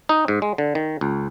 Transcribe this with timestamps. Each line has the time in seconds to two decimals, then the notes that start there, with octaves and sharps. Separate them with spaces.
0.09 D#4
0.28 G#2
0.42 G#3
0.58 D3
0.75 D#3
1.01 C#2